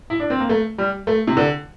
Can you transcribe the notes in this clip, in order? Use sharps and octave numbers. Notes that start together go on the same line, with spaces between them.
E4
D4
C4
A#3
A3
G3
A3
C3
D3